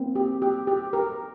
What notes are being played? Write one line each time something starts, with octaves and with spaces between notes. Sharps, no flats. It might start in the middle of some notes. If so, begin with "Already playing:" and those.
Already playing: A#3 C4
G4
G4
G4
G4 A#4